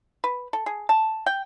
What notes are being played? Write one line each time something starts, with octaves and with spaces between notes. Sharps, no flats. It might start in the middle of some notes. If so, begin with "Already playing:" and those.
B4
A4
G#4
A5
G5